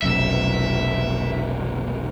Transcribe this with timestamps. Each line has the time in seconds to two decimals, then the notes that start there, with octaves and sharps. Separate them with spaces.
0.02 F1 B1 C#4 E5